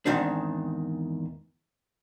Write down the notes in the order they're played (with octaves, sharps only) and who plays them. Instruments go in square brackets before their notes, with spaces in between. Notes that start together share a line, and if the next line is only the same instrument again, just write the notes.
[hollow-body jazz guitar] E2 G#2 D#3 C4 D4